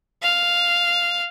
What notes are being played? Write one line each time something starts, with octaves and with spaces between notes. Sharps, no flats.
F5